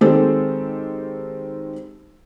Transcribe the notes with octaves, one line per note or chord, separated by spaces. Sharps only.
D#3 G#3 C4 G4 A4